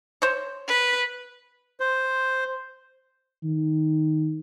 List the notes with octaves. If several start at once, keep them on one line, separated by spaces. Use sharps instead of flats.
C5 C#5
B4
C5
D#3